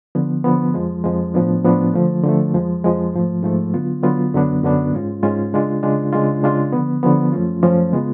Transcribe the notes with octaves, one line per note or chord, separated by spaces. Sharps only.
D3 F3 B3
D3 F3 B3
F2 F3 G#3
F2 F3 G#3
A2 F3 B3 D4
A2 F3 B3 D4
D3 F3 A3
D3 F3 A3
F2 F3 G#3
F2 F3 G#3
G#2 F3 A3
G#2 F3 A3
D3 F#3 B3 F4
D3 F#3 B3 F4
F#2 D3 F#3 B3 D4
F#2 D3 F#3 B3 D4
G#2 G#3 C#4 F4
G#2 G#3 C#4 F4
C#3 G#3 D4 F4
C#3 G#3 D4 F4
C#3 G#3 D4 F4
C#3 G#3 D4 F4
D3 F3 B3
D3 F3 B3
F#2 F3 A3 C#4 F4
F#2 F3 A3 C#4 F4
C#3 G#3 B3 F4